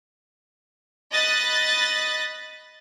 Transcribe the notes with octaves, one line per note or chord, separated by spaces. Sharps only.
D#5 B5 F#6 A6